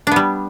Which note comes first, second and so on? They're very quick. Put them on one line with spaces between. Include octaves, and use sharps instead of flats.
D4 B3 G3